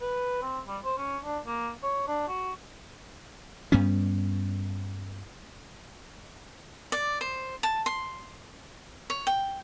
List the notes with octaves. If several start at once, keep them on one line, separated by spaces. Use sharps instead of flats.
B4
C4
G3
C5
C#4
D4
A#3
C#5
D4
F#4
G2 G3 B3 C#4
D5
C5
A5
C6
C#5
G5